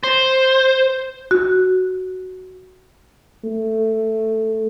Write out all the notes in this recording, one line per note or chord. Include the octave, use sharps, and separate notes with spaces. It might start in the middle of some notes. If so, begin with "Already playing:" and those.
C5
F#4
A3